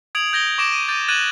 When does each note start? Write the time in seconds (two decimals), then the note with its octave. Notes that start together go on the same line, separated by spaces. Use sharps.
0.15 D#6 G#6 D7 F7 F#7
0.33 G6 G#6 A#6 D7 G7
0.58 C#6 D6 A#6 D7 E7
0.73 D#7
0.88 D6 G6 A6
1.09 F#6 G#6 A6 D#7 E7 F#7